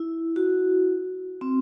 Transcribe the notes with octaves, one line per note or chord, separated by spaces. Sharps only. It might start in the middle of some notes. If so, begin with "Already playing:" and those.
Already playing: E4
F#4
C4